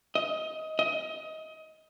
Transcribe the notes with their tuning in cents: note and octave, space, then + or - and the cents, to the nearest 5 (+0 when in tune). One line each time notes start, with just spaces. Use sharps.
D#5 +20
D#5 +25